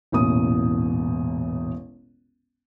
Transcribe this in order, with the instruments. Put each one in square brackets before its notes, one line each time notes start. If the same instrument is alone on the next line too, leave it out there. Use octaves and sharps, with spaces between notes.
[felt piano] E1 A1 E2 A#2 D#6